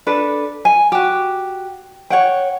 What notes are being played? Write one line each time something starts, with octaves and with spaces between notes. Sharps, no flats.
D4 A4 B4
G#5
F#4 G4
C#5 F#5 G5